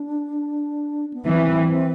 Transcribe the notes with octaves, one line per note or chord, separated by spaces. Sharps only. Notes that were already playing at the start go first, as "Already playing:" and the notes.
Already playing: D4
B3
E3 C4